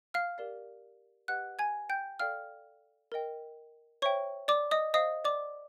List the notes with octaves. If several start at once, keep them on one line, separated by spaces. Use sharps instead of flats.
F5 F6
G4 A#4 D5 F5
G4 B4 D#5 F#5 F#6
G#5 G#6
G5 G6
A4 D5 F5 G5 F6
A#4 D#5 G5
C5 C#5 E5 G5 C#6
D5 D6
D#5 D#6
C5 D#5 F5 D#6
D5 D6